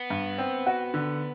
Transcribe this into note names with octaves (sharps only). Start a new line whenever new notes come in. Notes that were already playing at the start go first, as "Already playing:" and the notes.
Already playing: B3
G2
C4
F#4
D3